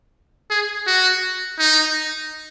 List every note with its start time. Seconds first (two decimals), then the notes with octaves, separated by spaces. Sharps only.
0.50 G#4
0.87 F#4
1.59 D#4